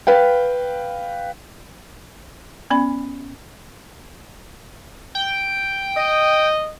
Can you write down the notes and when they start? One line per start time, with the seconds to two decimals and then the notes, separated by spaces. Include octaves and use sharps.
0.07 B4 F5 G5
2.70 B3 C#4 D5 B5
5.15 G5
5.96 D#5